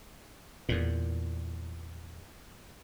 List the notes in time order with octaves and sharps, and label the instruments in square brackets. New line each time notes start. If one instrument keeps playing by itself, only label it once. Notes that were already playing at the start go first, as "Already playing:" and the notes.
[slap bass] E2 A#2